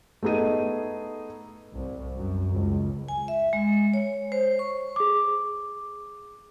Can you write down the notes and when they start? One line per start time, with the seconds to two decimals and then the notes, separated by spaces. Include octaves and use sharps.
0.22 A3 B3 D#4 G#4 D#7
1.74 C2
2.17 F#2
2.54 C#2
3.08 G#5
3.28 E5
3.53 G#3
3.94 C#5
4.32 C5
4.59 C#6
4.96 G#4 D6